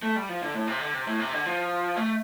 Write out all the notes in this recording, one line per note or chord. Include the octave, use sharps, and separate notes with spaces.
A3
G3
F3
D3
A2
C3
D3
C3
A2
C3
D3
F3
A3